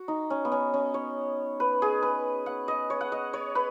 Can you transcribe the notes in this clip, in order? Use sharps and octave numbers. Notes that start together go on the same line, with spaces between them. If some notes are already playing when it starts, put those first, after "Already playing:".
Already playing: F#4
D#4
C#4
B3
C#4
C#4
C#5
B4
G#4
B4
F#5
D#5
C#5
F#5
D#5
C#5
B4